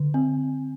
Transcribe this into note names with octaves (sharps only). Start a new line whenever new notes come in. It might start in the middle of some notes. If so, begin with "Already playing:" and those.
Already playing: D3
C4